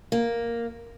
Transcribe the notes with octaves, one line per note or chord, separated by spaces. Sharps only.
A#3